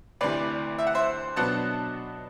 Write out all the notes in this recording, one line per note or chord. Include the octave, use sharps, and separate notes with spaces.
D2 C3 E3 B4 D5
E5
F#5
C5 E5
B2 F#3 B3 D4 F#5 A5